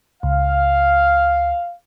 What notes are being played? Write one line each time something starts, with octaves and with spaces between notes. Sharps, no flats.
C#2 F5